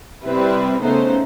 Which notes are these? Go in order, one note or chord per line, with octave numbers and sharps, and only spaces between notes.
C3 G3 C4 E4 B4
C#3 A3 B3 D#4 C5